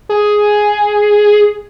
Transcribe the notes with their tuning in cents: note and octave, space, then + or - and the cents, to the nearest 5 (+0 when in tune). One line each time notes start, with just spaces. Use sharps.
G#4 +5